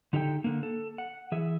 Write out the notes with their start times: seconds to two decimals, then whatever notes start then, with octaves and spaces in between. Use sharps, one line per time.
0.13 D3 D#4 G4 A4 E5 G5
0.44 D3 A#3
0.63 A4
0.98 F#5
1.32 E3 G#4 E5